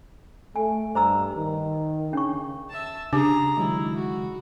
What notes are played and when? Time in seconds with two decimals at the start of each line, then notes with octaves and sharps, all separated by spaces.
0.56 A3 G#5
0.95 G2 C5 A#5 E6
1.35 D#3
2.13 C#3 C#4 D4 C#6
2.69 E5 A5
3.13 C#3 D4 G4 G#4 A#5 D6
3.57 D#3 F#3 G#3 E4
3.97 F#4